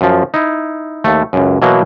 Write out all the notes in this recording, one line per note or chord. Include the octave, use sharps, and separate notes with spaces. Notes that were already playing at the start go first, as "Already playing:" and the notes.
F#2 F3
D#4 E4
D#2 A3
C#2 F#2
B2 E3 F#3 A#3